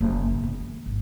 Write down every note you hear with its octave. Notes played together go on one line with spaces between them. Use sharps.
F#1 F#2
G#2 C#3
B3
D#3
G#1